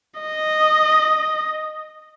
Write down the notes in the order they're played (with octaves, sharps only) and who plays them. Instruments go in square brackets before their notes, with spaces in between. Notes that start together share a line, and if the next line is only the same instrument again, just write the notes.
[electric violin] D#5